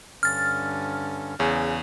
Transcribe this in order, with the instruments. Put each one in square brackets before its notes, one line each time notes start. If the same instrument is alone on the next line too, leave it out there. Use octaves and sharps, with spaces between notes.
[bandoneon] G2 D3 C#4 [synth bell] F6 A6
[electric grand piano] E2 [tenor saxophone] C#3